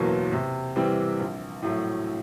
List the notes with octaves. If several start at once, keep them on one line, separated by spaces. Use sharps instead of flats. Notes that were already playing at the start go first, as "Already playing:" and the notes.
Already playing: F#1 E2 B2 F#3 A#3
C3
E3 G3 C4
A#1
A2 F#3 A3